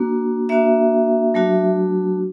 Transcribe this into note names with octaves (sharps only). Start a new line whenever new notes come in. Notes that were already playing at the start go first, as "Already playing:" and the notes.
Already playing: A#3 D4 F#4
A#3 D4 F#4 E5
F#3 A3 D4 F#4